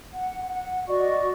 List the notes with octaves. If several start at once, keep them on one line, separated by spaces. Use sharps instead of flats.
F#5
F#5
F#4 D5 D#5 C#6